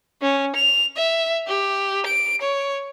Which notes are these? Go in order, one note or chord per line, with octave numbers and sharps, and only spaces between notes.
C#4
F7
E5
G4
D7
C#5